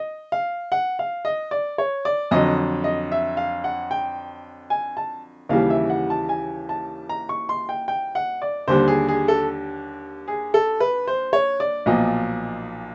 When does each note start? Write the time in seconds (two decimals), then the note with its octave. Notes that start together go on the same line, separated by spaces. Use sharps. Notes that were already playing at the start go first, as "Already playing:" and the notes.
Already playing: D#5
0.32 F5
0.72 F#5
0.99 F5
1.25 D#5
1.51 D5
1.78 C#5
2.05 D5
2.31 F2 D3 F#3 D#5
2.84 D#5
3.12 E5
3.37 F5
3.64 F#5
3.91 G5
4.70 G#5
4.97 A5
5.49 D#2 C#3 E3 G3 F5
5.70 E5
5.90 F#5
6.10 A5
6.29 G#5
6.69 A5
7.09 A#5
7.29 C#6
7.49 C6
7.69 G5
7.88 G5
8.15 F#5
8.42 D5
8.68 D#2 D3 G3 C5
8.88 G#4
9.09 G#4
9.28 A4
10.28 G#4
10.54 A4
10.80 B4
11.07 C5
11.33 C#5
11.60 D5
11.86 B1 A#2 F3 D#5